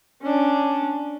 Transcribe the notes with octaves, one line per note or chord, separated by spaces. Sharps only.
C#4 D4